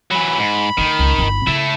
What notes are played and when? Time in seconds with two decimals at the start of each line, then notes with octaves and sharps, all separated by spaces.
0.11 E3 F#3 B5
0.39 G#2
0.78 D3 D#3 A3
0.99 C#2
1.18 G1 D#4
1.47 C#3 A3 E4